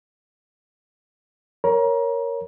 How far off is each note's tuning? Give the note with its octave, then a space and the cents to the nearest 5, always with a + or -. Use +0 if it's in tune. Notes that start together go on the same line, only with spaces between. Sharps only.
A#4 +0 C#5 +0 A#5 +30